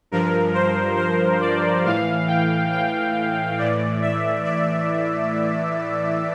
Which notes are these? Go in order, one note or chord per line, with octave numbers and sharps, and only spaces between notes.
G2 F3 A#4
C5
C5
D5
A2 E3 F5
G5
G5
A2 E3 D5
E5
D5